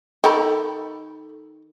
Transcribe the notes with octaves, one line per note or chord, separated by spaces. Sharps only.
D#3 G4 A4 A#5 B5